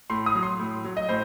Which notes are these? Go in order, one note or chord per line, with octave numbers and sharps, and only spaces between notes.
A2 C6
D#6
F#3
C6
A2
F#3
D#5
A2 C5